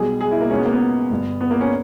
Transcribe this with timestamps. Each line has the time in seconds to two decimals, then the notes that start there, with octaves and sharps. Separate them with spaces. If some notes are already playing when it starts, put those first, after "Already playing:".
Already playing: B1 B2 G3 G#4
0.21 G#4
0.31 E4
0.41 A#3
0.51 C#2 B2 G#3 C#4
0.58 B3
0.65 A#3
0.72 B3
1.10 G1 G2 G3
1.41 B3
1.51 A#3
1.61 C#4